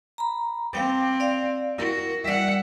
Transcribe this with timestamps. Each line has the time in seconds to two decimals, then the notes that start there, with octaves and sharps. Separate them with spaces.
0.18 A#5 B5
0.73 C4 F5 G5 D6
1.20 D5 F5
1.78 E4 F#4 A#4
2.25 G3 D5 E5 F#5